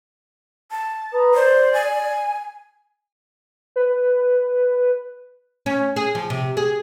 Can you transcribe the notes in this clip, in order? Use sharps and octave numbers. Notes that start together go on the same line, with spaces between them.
A5
B4 A#5 D#6
C5 D5
G#5
B4
C#4
G#4
F3
C3
G#4